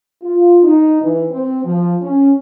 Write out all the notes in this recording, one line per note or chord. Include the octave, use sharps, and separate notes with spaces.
F4
D#4
E3
C4
F3
C#4